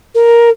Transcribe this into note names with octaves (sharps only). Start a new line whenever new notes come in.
A#4